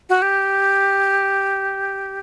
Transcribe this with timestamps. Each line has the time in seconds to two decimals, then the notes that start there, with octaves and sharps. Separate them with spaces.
0.09 F#4
0.22 G4